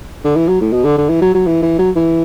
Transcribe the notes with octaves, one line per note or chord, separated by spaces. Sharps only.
D3
E3
F#3
A2
B2
D3
D3
E3
F#3
F#3
E3
E3
F#3
E3